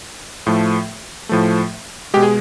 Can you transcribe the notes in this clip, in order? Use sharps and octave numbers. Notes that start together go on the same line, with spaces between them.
A2 F3 A3
A2 F3 A3
B2 G#3 G4
G#4